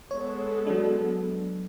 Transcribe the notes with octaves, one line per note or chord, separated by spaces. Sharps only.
G#3 B3 A4 C#5
F#3 D4